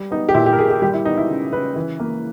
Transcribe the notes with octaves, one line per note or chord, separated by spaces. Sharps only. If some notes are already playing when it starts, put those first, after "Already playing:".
Already playing: G3
B3 D#4
G4
A#2 E4
G4
A#4
A#2 G#4
G4
G3 G4
E4
B3 D#4
E4
C#3
C#3 B4
E3
A#3